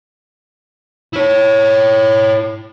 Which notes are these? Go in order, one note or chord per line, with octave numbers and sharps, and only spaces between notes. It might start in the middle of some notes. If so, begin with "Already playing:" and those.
E4 C#5